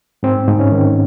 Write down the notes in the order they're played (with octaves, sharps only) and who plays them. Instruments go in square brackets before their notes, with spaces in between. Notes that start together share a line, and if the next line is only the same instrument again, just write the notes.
[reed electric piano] G#2 C4
G#2
C#4
D#3